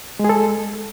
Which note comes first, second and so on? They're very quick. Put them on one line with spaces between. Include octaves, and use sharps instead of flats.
G#3 G#4 A4